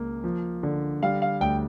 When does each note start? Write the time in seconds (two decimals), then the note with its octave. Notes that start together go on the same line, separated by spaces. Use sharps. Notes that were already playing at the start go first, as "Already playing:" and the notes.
Already playing: C#2 A#3
0.24 F3
0.63 D3
1.03 G3 F5
1.22 F5
1.41 D2 G5